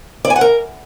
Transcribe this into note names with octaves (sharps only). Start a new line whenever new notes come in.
D5
G#5
F#5
A#4